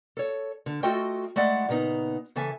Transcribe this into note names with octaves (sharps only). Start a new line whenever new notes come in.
A4 C#5
D3
A3 F4 F#4 A4 D#5 G5
G#3 A3 E4 D5 F#5
A#2 C#3 B3 D#4
C#3 E3 A4 E5 G#5